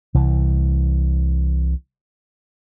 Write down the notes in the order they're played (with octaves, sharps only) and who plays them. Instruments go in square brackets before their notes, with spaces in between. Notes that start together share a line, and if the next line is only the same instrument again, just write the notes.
[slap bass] C2 E3